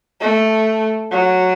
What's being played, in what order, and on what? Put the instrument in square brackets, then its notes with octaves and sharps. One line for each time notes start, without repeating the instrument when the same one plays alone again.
[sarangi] A3
F#3